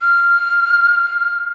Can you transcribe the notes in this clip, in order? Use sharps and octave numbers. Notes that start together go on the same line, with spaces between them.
F6